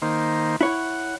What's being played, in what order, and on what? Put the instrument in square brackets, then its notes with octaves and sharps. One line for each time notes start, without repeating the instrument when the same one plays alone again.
[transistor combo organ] D#3 A#3 C5
[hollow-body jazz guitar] E4 C#5 [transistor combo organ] F#5